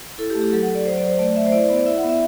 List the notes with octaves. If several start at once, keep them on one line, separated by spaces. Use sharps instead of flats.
E4 A4
G4
A3
G4
F#3 A4
F#5
F#3
D5
F#3 C5
D5
F#3 C5
A3 D5
A3 E5
C5
E4 D5
B3
D5
E4 E5
F#5
B3
E5